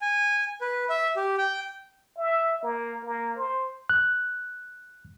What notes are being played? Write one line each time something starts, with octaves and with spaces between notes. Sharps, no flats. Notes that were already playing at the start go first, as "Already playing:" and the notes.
G#5
B4
E5
G4
G5
E5
A#3
A#3
C5
F#6